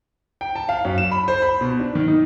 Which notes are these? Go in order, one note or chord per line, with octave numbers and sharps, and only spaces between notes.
G5
A5
F5
F#2
E7
B5
C5
B5
B2
D4
D#3
D#4